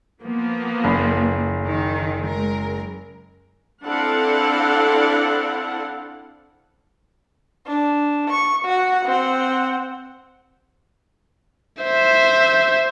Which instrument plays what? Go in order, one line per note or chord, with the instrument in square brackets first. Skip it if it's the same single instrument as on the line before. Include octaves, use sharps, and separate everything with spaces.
[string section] F3 A#3 B3
[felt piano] F#1
[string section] D#3
G#3 A#4
[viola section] C4 D4 E4 A4 F5 F#5
[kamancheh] D4
C#6
F#4 F#5
C4 F#5
[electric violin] C5 E5